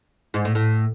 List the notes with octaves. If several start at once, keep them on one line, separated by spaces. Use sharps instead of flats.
G#2
A2
A2